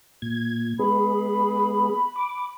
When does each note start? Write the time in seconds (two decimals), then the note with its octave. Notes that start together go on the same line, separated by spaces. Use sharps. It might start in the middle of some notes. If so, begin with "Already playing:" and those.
0.22 A#2 G#6
0.79 G#3 B3 G#4 B5
2.16 D6